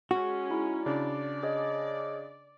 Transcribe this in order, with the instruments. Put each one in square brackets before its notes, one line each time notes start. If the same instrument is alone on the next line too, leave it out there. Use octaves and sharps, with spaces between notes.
[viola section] G#3 C#4 [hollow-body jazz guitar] F#4
[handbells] D#4 E4
[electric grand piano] C#3 D4 [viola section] D5
[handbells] G#4 C#5 D#5